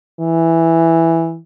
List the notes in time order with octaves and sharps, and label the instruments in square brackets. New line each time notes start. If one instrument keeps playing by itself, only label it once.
[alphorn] E3